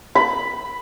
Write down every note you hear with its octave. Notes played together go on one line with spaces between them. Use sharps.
B5